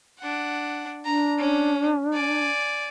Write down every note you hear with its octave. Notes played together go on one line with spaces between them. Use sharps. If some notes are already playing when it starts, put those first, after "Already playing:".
D4 F#5
D4 A#5
C#4
D5 G#5